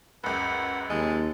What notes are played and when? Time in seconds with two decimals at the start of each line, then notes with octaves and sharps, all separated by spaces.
0.24 C#2 F#2 B4 F#5
0.90 D#2 G#3 A5